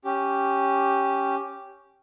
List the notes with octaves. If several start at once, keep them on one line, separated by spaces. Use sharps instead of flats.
C#4 G4